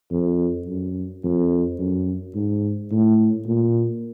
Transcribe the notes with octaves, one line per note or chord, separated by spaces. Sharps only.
F2
F#2
F2
F#2
G#2
A2
A#2